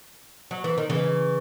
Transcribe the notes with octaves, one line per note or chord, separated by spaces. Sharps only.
F#3
E3
D#3
C#3 E3